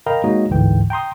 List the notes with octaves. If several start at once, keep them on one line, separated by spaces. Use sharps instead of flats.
A#4 D#5 F5 G5 A#5 B5
G#3 A#3 D#4 F#4 C#5 D#5
G1 D2 G#2 D3 E3 G5
G5 A#5 C6 D#6